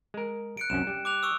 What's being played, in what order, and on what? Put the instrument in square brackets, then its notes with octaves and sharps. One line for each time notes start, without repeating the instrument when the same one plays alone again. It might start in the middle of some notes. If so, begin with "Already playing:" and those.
[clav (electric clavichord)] G#3 A#4
[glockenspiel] F#6 C#7 D7
[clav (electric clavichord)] C2 F#2 C#4 [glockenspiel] E7
[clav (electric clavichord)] G3
[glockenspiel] D6 F#6 F7
C#6 D#6 E6